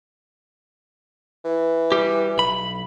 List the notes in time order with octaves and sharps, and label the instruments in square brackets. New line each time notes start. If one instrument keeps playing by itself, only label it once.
[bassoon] E3
[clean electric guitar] G3 G4
B1 B5